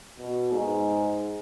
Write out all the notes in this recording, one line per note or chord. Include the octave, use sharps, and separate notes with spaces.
B2
G#2